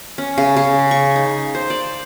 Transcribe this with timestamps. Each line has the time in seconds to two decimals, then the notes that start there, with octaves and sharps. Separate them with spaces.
0.18 C#4
0.38 C#3
0.56 C#3
0.91 C#6
1.16 D#4
1.55 C5
1.70 D5